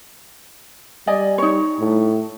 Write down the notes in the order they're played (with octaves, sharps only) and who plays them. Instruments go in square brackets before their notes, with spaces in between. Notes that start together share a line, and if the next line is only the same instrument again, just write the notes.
[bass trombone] G3 [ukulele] D5 D#5 G#5
[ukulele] D#4 C#5
[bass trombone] A2